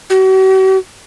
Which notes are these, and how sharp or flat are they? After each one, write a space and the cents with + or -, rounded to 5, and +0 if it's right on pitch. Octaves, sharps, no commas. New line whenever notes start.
F#4 +45